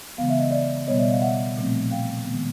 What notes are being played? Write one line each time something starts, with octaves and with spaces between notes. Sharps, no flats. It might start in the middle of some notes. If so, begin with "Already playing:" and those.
C#3 E3 G#3 B3 F5
E5
D#5
D5 E5
B2 G3 B3 C#5 D#5
D5 E5
D#5 F5
E5 F#5
A#2 F3 A3 C4
F5 G5
D#3 G#3 B3